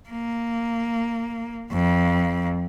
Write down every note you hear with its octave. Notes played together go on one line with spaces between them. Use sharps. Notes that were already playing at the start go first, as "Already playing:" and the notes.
A#3
F2